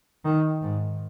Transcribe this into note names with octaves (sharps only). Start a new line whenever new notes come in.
D#3
G#2